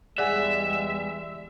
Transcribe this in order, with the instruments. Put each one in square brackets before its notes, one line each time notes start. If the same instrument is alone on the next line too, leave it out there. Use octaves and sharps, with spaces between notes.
[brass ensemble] E2 G3 G#3 [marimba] G#4 F#5 G#5 [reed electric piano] D5 [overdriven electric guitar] E5